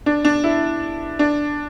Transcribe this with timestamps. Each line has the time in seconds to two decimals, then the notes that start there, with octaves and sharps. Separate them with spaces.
0.06 D4
0.25 D4
0.44 E4
1.19 D4